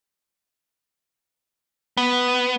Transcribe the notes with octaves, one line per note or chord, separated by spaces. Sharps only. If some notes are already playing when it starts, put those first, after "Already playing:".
B3